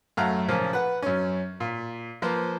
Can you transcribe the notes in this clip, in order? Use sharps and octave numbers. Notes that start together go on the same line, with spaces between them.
F#2 A3 F5 F#5 A#5
A#2 C#3 F3 A#3
B4 F#5
F#2 C#4
A#2
F3 A#3 B4 C5